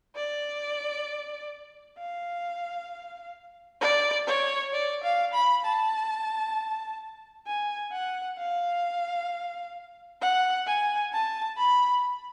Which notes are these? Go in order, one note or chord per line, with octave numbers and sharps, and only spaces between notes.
D5
F5
D5
C#5
D5
F5
B5
A5
G#5
F#5
F5
F#5
G#5
A5
B5